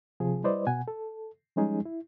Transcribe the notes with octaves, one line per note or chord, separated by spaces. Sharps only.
C3 F3 G#4
G3 E4 B4 C5 D5 D#5
B2 F#5 G#5
A4
F3 G3 G#3 C#4 D#4 G#4
E4